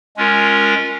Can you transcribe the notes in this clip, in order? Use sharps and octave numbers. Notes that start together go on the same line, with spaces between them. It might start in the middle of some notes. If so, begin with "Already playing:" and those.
G#3 C#4 F4 A#4